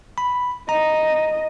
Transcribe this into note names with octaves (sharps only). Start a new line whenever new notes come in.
B5
D#5 A#5